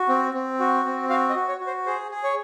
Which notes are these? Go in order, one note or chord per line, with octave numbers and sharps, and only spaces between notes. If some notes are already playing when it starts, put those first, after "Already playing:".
Already playing: F#4
C4
C4
F#4
C4
F#4 F5
D#5
F#4
C#5
F#4
C5
G#4 C5
G#4
C#5